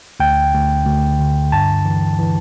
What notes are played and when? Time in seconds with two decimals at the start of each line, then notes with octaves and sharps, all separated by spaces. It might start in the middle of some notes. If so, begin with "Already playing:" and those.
0.20 D2 G5
0.53 D2
0.86 D2
1.19 D3
1.52 G2 A5
1.86 E3
2.19 E3